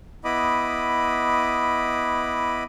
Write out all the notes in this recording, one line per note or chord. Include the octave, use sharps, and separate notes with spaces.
B3 E4 D#5 B5 D6 D#6